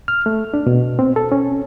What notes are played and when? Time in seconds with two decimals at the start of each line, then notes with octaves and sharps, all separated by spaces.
0.08 F6
0.26 A3
0.54 D4
0.67 B2
0.99 C4
1.16 A4
1.32 C#4